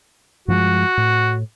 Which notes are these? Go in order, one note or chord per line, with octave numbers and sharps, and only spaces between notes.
G2 F3 G#3 F#4
A2